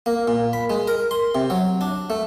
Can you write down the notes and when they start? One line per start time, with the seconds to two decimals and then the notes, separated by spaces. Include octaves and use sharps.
0.06 A#3
0.28 A#2
0.53 B5
0.70 G#3
0.88 A#4
1.11 C6
1.35 C3
1.50 F#3
1.81 D4
2.10 A3